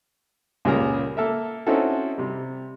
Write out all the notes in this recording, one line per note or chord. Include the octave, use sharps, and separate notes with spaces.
C#2 A#2 G3 G#4 A#4 A#5
A#3 A4 A#4 E5
C4 C#4 D#4 E4 F#4 A4
C3 G3